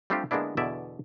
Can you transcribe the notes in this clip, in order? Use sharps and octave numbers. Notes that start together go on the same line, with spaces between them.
G3 A3 C4 D4 F4 G4
D3 G#3 A#3 B3 D4 E4
E2 B2 D3 E4 D5 E5